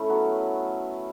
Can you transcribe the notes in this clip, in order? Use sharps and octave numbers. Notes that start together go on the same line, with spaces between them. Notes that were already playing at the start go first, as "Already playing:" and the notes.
Already playing: A3 C#4 E4
F#3 B3